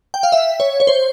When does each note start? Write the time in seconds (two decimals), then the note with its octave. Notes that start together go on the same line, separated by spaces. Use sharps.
0.14 G5
0.23 F5
0.32 E5
0.60 C#5
0.80 C#5
0.87 C5